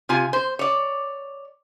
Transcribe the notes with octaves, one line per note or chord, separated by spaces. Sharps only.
C3 F4 G#5
C5
C#5 D5